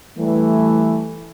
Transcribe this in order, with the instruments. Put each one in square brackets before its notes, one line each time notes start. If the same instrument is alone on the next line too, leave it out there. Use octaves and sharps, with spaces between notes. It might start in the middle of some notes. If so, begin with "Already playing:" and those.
[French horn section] E3 G3 A3